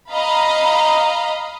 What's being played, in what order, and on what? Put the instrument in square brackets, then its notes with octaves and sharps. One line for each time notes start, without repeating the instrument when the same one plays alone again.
[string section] D#5 F5 A#5 B5